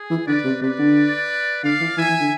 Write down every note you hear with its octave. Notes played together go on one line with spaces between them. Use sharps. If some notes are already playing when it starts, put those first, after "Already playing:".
Already playing: G#4
E3
D3 B4 D5
C3
C3 B4 D5
D3
D3 D5 F5
E3
E3 E5 G#5
E3
D3